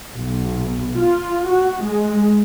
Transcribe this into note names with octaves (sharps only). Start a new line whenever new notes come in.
B1
F4
F#4
G#3